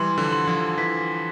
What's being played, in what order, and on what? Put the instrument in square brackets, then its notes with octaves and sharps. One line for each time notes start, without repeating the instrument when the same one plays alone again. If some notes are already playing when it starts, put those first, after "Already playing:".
Already playing: [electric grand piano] E3 G3 [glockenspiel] C6
[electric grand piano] D3 F3
[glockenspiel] C6
[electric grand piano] D3 F3
[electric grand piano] E3 [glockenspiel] B6